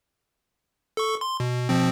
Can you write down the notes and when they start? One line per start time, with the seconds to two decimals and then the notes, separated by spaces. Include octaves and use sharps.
0.97 A4 C#6
1.21 C6
1.40 B2
1.69 B2 F3 C4